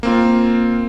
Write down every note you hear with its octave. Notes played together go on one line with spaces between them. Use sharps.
A#3 C4 F4